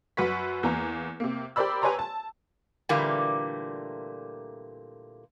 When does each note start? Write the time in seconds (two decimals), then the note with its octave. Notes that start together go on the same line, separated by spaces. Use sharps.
0.17 F#2 F#4 B4 C#6 B6
0.63 E2 A#3 A#5
1.20 C3 A#3
1.56 G4 A#4 C5 D5 B5 E6
1.82 G4 B4 C#5 G#5 A#5 C6
1.99 A5
2.89 A#2 D3 E3 G3 A3 A#3